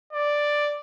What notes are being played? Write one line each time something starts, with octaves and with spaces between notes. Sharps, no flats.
D5